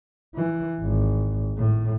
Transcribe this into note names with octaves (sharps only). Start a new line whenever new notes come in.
E3
G#1
A2